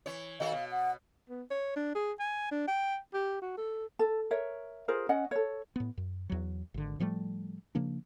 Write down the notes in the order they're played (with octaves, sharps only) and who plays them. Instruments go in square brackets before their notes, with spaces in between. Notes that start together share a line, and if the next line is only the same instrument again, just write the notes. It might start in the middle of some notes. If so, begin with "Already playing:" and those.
[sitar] E3 C#5
[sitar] D#3 F#4 A4 [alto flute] F5
[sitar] B2
[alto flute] F#5
[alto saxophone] B3
C#5
D4
G#4
G#5
D4
G5
G4
F#4
A4
[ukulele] A4
A#4 C#5 E5
F4 G#4 A#4 C5
C#4 D#5 F#5
A4 C#5
[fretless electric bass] A2 B3
F#2
E2 F#3
G#1 D3
A2 F3 G3 A3
C#3 F3 A#3 D4